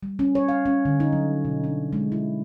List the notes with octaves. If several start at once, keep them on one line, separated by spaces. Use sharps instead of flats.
G3
C#4
C#5
F5
C#4
D3
D#4
F#3
B2
D4
G#3
E4